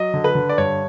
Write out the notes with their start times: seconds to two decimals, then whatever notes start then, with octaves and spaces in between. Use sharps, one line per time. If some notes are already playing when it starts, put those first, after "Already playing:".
Already playing: F#3 D#5
0.14 D3
0.24 B4
0.35 D3
0.49 D5
0.58 G2 C#5